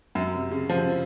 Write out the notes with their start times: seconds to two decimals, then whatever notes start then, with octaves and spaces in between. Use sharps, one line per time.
0.15 F#2
0.34 C3
0.51 C#3
0.69 F3